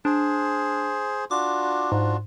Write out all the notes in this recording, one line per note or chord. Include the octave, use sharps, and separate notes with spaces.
D4 G#4 C5
D4 F4 F#4 D6
G#2